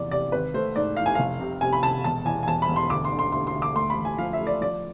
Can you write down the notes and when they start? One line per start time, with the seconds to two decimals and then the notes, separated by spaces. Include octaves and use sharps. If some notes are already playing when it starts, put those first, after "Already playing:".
Already playing: F1 E2 D5
0.11 C3 D5
0.32 G#1 B4
0.54 A3 C5
0.76 G#2 D5
0.97 E3 F5
1.06 G#5
1.15 F1 F5
1.40 C3
1.61 C3 G#5
1.73 B5
1.83 C3 A5
2.04 E1 A5
2.25 E2 G#5
2.43 G#5
2.48 E1 A5
2.62 B5
2.69 E1
2.76 C6
2.90 D2 D6
3.05 C6
3.12 D3
3.19 C6
3.32 D2 C6
3.47 C6
3.54 D2
3.62 D6
3.76 A3 C6
3.90 B5
3.97 A1
4.05 G#5
4.18 F3 F5
4.33 E5
4.41 A3
4.47 D5
4.61 F3 D5